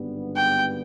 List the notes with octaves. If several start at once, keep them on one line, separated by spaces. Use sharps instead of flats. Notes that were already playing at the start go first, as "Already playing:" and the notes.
Already playing: G#1 G2 D3 G3 B3
G5